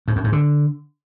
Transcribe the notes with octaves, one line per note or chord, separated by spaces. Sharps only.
G#2
F#2
G#2
D3